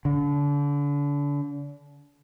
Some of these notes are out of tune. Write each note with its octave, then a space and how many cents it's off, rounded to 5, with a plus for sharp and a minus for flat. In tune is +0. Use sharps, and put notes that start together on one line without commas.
D3 -35